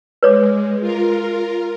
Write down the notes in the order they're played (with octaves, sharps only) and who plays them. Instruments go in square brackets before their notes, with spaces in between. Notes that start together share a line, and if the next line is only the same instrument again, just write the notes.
[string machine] G#3 [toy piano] B4 C#5 D6
[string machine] F4 A#4